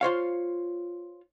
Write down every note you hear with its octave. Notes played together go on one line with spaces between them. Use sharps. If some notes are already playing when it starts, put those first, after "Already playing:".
F4 C5 C#5 F5